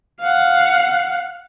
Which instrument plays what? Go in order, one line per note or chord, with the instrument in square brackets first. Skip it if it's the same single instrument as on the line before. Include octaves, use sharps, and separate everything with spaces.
[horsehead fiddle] F5 F#5